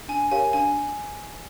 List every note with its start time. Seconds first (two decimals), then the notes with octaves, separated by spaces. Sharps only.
0.08 D4 G#5
0.31 G4 A#4 C#5 F5 G#5
0.53 D4 G#5